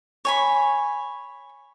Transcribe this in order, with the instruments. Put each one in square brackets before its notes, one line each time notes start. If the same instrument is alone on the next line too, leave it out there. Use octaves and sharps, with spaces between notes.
[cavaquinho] C#5 G#5 B5